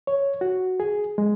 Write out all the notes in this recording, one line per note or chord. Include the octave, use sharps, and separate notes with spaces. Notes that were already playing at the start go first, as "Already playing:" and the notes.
C#5
F#4
G#4
G#3